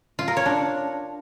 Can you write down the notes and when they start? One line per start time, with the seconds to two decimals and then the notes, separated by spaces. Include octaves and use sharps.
0.19 F4
0.28 A#4
0.37 C#5
0.46 D4